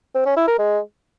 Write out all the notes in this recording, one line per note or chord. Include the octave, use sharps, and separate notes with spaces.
C4
C#4
E4
A#4
G#3